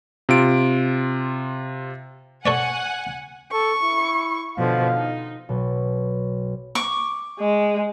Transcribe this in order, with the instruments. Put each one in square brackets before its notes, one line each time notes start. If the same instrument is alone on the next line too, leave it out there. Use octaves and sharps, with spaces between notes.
[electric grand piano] C3 F4 D7
[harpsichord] A4 C#5 D5 [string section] F#5 G#5
[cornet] A4 [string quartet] C#6
[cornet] E4
[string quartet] B2 D3 F3 [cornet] F5
[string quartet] D#4
[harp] B1 B2
[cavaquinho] C#6 D6
[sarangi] G#3